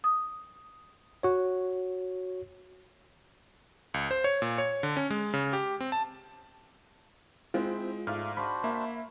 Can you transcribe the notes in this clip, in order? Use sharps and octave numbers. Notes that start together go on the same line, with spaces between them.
D#6
F#4 C#5
C#2
C5
C#5
A#2
C#5
D3
C#4
G#3
C#3
G4
C4
A5
G#3 C4 E4 F4
G#2 A3 D5 F5 F6
D4 F#4 C5 B5
A#3 E5